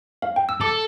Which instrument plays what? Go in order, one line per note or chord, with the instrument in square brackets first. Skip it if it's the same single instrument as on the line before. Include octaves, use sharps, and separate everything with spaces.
[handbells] F5
G5
E6
[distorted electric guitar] A4 [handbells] D6